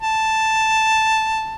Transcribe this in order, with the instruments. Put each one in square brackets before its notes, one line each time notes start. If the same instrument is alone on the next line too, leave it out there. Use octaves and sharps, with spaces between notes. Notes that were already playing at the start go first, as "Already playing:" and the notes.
[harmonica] A5